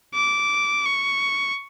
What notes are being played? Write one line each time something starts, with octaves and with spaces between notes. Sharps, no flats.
D6
C#6